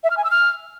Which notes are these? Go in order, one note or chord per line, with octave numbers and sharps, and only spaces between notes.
E5
F6
G#5
E6
F6